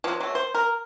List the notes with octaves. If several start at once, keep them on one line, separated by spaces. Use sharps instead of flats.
F3 F#3
F#3 A3
C5
A#4